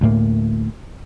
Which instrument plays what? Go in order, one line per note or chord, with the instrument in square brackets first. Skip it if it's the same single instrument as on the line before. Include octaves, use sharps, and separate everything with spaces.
[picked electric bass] D2 A2 A#3